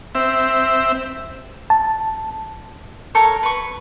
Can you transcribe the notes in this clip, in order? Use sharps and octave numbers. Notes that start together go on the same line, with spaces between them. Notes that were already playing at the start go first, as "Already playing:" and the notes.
C4 E5
A5
A4 A#4 C#5
B4 C#6